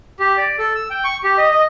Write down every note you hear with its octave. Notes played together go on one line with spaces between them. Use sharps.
G4
D5
A4
E6
G5
C#6
G4
D#5
D#5